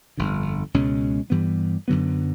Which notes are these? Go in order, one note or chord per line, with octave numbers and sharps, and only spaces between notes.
G1 F2 D3
C#2 B2 G#3 C#4
G2 E3 G3 B3
F#2 D3 F#3 B3